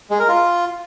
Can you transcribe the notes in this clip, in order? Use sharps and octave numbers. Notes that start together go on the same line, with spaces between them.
G#3
A#4
F4